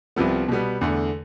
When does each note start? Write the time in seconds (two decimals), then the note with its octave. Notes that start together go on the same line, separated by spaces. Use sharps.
0.16 C2 C3 F3 B3
0.48 B2 G3 B3
0.81 E2 D3 A3